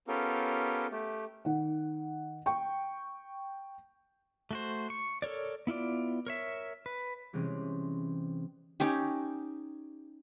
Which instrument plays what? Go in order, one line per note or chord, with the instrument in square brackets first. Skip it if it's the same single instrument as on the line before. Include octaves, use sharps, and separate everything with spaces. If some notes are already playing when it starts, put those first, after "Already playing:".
[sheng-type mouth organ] B3 C#4 F4 G4 A4 A#4
A3 G4
[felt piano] D#3 F#5
G5 C#6
[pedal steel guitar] A3 F#4 C5
C#6
A4 A#4 C#5 D5
B3 E4 F4 D5
A#4 C#5 E5
B4
[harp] C3 E3 G3 G#3 C4 C#4
[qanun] C#4 D#4 G4